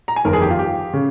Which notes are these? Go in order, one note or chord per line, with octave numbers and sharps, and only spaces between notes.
A#5
G#5
G1 F2 D#3 A#4
G#4
G4
F4
G4
C#3